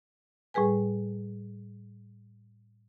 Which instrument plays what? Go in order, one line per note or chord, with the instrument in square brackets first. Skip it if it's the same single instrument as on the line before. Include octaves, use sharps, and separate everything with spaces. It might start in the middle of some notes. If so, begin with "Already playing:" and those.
[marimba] A2 G3 G#4 B4 G#5